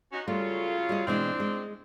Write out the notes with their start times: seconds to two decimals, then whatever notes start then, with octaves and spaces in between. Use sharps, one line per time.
0.13 C#4 D#4 F#4
0.28 C#3 F#3 G3 A3 F4
0.89 G3 G#4 D#5
1.07 B2 E3 G#3 C4 D4
1.40 G#3